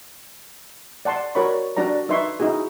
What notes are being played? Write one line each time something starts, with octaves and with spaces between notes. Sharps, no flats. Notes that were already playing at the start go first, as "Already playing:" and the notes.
D5 F#5 A5 C6
F#4 A#4 C#5 D5 B5 C#6
D4 F#4 D5 A#5
D#4 B4 E5 C6 C#6
D#4 E4 F#4 G#4